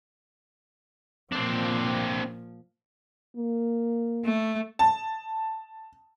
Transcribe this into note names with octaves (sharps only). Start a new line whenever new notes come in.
A#2 F3 C4 D4
A#3
A3
A5